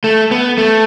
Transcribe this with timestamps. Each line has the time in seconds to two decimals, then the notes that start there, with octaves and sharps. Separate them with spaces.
0.04 A3
0.31 B3
0.58 A3